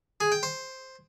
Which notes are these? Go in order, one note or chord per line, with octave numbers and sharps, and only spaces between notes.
G#4
G5
C5